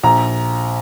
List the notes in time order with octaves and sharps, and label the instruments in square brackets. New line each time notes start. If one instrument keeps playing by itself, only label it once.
[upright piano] A#1 A#5